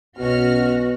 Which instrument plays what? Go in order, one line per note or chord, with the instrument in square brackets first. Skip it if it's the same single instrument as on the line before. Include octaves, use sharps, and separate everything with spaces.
[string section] B1 C#4 F6 [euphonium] B2 [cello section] F#4